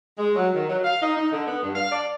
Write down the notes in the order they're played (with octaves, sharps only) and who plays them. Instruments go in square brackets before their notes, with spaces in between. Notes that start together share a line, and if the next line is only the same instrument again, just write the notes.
[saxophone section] G#3
F#3
D#3
F#3
F5
D#4
D#4
D3
B3
G2
F5
D5